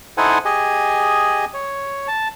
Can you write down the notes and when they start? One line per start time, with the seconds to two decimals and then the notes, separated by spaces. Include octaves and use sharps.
0.18 D#4 E4 A4 C5 F#5 G#5
0.45 G4 G#4 D#5 G#5
1.54 C#5
2.08 A5